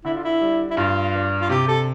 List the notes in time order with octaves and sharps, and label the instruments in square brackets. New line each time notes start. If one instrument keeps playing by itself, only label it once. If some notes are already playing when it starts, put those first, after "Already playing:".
[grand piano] D3 [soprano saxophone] E4
[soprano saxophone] F4
E4
[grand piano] G3
[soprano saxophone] E4
[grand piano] G2 [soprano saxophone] F4
[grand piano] D4
[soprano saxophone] F4
[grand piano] C3 [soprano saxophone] G4
[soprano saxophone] A4